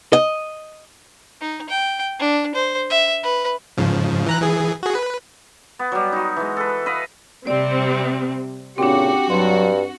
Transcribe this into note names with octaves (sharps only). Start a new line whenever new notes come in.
D#5
D#4
G5
D4
C5
E5
B4
G#2 C#3 F3
E3 A#5 F#6
E3 G#4
F#4 G#4
B4
B3
F#3 G3
D#4 F#4
E3 G#3
A4 B4
B4 D#5 F5
C3 G3 C4 D5
A#2 C#3 C4 D4 F#4 G4
G2 F#3 C6